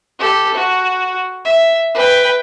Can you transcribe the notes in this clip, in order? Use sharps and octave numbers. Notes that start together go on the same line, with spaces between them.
G4 A4
F#4
E5
B4 G5